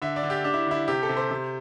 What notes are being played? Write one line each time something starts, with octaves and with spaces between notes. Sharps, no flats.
D3 E5
D5
D3
G4
D4 G4
E4
D3 E4
C3 G4
A4
C3
C5
C3